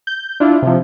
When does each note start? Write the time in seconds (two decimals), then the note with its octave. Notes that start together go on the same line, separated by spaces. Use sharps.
0.07 G6
0.40 D4 E4 F4
0.62 C3 F3